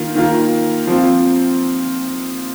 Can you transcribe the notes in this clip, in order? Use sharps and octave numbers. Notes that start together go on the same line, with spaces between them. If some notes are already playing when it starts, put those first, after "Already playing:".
Already playing: D#3 A#3 F4
D#3 A#3 F4
F3 C4 F4